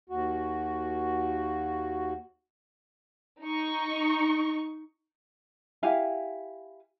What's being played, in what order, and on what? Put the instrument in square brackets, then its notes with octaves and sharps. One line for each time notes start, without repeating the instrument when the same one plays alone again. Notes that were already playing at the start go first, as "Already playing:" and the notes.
[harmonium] D#2 F#4
[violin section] D#4 C#6
[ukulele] E4 G4 F5 G#5